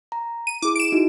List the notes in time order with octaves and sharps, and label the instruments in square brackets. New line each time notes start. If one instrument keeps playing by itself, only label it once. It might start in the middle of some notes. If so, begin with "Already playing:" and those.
[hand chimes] A#5
[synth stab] D#7
[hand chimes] E4 G#4 [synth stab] D6
[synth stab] D7 E7
[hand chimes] D#4 E4 F#4